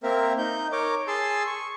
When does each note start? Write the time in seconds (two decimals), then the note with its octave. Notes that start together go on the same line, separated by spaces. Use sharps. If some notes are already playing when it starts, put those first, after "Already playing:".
0.03 A#3 C4 A#4 E5
0.38 D#4 G6
0.72 A#4 C#5 D6
1.07 G#4 A5 C6 E6
1.47 C#6